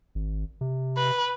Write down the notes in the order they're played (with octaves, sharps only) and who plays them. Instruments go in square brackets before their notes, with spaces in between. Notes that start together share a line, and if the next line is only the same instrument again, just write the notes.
[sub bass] G#1
C3
[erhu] B4